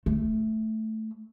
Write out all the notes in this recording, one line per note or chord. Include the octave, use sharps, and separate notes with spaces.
A3